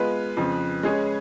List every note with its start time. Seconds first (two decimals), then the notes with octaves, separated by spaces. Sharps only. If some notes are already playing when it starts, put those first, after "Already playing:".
Already playing: G#3 B3 F4 B4
0.37 F2 C#3 F3
0.83 G#3 C#4 G#4 C#5